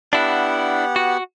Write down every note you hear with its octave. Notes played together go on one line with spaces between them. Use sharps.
B3 D4 E4 G4 F#5
F#4